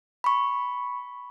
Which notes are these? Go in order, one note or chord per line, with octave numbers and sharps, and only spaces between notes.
B5 C#6